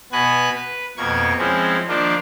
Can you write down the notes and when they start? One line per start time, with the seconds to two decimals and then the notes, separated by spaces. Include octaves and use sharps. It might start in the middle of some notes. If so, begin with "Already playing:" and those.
0.12 B2 B3 F#4 B4 G#5 F#6
0.56 B4
0.97 F2 B2 A#3 C#6 G#6
1.38 F3 G#3 C4 C#4 E4
1.88 D#3 F3 A#3 D4 F4